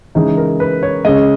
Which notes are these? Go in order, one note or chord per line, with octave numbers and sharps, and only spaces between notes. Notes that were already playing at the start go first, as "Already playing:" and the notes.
C#3 E3 G#3 D#4
A#4
B4
C#5
C#3 G#3 D#5